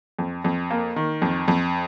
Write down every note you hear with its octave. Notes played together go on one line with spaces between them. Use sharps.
F2
F2
A#3
D#3
F2
F2